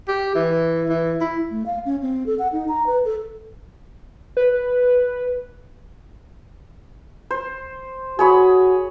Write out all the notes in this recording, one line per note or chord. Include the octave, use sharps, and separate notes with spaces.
G4
E3
E3
E4
A3
F5
C#4
C4
A4
F#5
D#4
A#5
B4
A4
B4
C5
F#4 G#4 C#5 B5